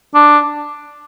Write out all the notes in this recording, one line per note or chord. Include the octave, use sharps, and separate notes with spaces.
D4